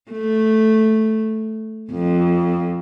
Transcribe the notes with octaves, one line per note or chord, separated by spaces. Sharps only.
A3
F2